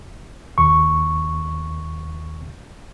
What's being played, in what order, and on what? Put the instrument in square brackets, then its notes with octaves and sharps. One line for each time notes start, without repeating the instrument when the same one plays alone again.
[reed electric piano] D#2 C#6